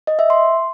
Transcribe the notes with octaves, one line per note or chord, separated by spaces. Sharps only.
D#5
E5
C6